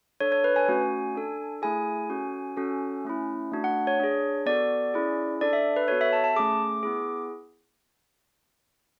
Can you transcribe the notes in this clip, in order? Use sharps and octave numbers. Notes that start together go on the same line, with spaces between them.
D4 A4 C#5
C#5
B4
G#5
A3 C#4 F#4
D4 A4
A3 E4 G#4 G#5
C#4 F#4 A4
C#4 F#4 A4
A3 C#4 E4
A3 D4 F#4
F#5
C#5
D4 G#4
B3 F#4 A4 D5
C#4 E4 G#4
D4 A4 D5
E5
B4
B3 F#4 A4 C#5
E5
A5
A5
A3 C#4 G#4 D6
B3 E4 G#4